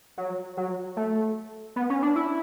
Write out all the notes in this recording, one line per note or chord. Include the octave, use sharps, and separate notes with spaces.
F#3
F#3
A3
B3
C#4
D4
E4